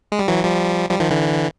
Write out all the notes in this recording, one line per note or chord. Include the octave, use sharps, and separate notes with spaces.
G#3
G3
E3 F#3
F3 G3
F3 G3
D#3 F3
D3 E3